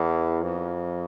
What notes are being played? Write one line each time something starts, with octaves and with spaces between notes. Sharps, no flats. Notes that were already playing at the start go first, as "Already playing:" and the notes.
Already playing: E2
F2